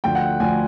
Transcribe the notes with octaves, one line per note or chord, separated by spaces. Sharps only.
D2 D3 F3 G5
F#5
D2 D3 F3 G#5